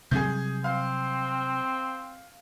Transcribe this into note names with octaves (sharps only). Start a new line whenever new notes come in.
C3 F#3 G3 G#4 G6
C4 F5